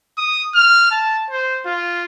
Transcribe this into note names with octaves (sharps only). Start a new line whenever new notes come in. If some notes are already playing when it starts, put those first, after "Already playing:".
D#6
F6
A5
C5
F4